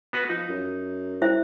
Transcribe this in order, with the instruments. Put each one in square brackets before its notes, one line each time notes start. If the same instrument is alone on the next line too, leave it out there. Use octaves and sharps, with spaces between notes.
[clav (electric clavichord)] B3 F#4 B4
[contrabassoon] F3 [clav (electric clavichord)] D#4
[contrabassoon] F#2
[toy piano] E4 C5 E5